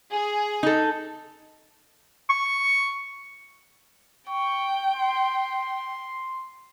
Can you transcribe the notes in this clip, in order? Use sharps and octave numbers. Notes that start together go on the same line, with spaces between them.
G#4
D#4 A4
C#6
G5 C#6
C6